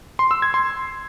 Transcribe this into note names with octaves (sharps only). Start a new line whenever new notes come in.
C6
E6
G#6
C6